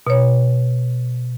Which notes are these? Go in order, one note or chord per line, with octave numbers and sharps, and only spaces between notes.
B2 C#5